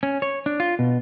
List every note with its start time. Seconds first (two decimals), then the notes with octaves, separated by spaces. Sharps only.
0.03 C#4
0.22 C#5
0.46 D4
0.60 F4
0.79 B2